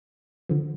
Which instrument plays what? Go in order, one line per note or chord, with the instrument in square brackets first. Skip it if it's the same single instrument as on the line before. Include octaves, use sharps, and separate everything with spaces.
[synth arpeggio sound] D3 F3